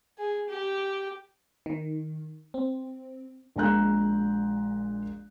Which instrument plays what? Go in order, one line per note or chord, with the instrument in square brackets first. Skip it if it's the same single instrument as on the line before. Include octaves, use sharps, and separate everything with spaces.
[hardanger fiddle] G#4
G4
[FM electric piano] D#3
C4
[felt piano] A#1 A#2 G#3 A#5 F#6 G6